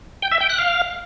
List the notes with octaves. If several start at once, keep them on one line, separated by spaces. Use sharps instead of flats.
G5
E5
G5
F#6
F5